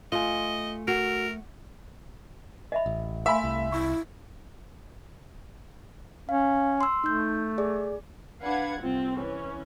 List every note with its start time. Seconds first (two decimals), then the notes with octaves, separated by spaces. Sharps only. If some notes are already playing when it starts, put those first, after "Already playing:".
0.12 A3 F4 D#5 G#5
0.88 F#4 A#4
2.72 D#5 E5 B5
2.86 A1
3.26 A3 E5 F5 G#5 B5 C6
3.44 C2
3.72 E4 C#6
6.29 C#4 F5
6.81 C6 E6
7.04 A3 D#4 G6
7.58 G#4 D5
8.42 D4 B4 F5 F#5 G#6
8.80 C2 C4 F4
9.17 E3 C#4